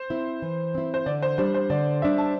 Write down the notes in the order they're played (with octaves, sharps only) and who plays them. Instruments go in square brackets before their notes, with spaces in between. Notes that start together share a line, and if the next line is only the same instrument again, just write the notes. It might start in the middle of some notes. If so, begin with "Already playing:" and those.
Already playing: [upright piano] C5
[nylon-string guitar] C4 E4
E3
C4 E4
[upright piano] C5
[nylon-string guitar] D3 [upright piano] D5
[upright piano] C5
[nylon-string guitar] G3 D4 [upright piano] C5
[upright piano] C5
[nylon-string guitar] D3 [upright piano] D5
[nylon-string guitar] G3 D4 [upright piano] E5
[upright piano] A5